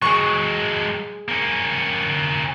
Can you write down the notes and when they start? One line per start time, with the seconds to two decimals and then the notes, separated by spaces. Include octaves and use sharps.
0.02 F#3 G#3 G#4 C#6
1.28 A#3 C#4